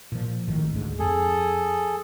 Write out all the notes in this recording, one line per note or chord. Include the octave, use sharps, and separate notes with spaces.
A#2 F3
G#1 A2 D#3
D2 G#2
F2 G#4 A4